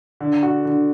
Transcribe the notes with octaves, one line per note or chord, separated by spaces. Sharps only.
D3
F#4
D3